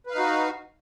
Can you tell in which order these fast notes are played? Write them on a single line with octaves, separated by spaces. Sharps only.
B4 F5 D#4 F#4